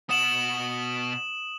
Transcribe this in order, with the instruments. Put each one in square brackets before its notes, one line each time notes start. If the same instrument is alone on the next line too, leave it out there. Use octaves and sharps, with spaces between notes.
[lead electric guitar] B2 F#5 [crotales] D#6 E7 F#7